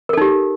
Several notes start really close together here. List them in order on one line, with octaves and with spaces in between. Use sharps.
A#4 A4 D#4 G4